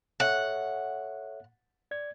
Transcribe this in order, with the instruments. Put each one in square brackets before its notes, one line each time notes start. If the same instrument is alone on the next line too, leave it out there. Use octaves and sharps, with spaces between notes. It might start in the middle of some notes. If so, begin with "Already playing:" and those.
[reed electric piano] A4 C#5 E5 [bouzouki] F#5
[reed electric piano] D5 G#6